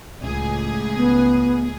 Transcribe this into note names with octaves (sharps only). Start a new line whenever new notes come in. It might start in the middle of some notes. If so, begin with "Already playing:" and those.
C#2 A2 G#4
B3